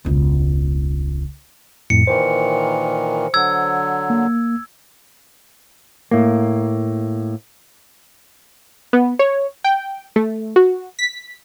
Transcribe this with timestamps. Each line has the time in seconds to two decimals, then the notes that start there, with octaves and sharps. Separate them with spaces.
0.05 E1 C#2
1.90 F2 A2 C#7
2.07 A#2 D#3 E3 C5
3.34 D3 F#3 E6 G#6
4.10 A#3
6.11 A2 A#3
8.93 B3
9.19 C#5
9.64 G5
10.16 A3
10.56 F#4
10.99 B6